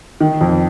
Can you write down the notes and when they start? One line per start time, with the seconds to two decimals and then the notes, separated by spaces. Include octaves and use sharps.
0.20 D#3
0.41 F2